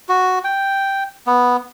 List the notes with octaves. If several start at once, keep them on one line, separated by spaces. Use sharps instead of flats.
F#4
G5
B3